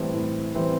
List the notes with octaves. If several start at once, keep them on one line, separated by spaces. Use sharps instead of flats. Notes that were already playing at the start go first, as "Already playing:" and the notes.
Already playing: A2 E3 G3 C4 E4
A2
E3 G3 C4 E4